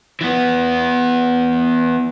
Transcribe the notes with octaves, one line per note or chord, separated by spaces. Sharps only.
E3 B3